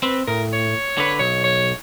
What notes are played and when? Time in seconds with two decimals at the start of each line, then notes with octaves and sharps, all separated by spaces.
0.03 C4 B4
0.28 A2 A#4
0.53 C#5
0.98 D3 B4
1.19 B1 C#5
1.44 C#5